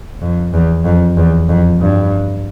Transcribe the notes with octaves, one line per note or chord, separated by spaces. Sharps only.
F2
E2
F2
E2
F2
G2